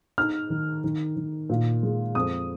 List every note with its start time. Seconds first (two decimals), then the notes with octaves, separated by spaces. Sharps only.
0.18 D#4 F6
0.50 D#3
0.84 D#3
1.16 D#3
1.50 A#2
1.83 G#3
2.15 F2 D#6